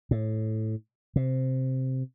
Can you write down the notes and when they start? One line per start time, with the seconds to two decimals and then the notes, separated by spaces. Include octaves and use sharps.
0.11 A2
1.16 C3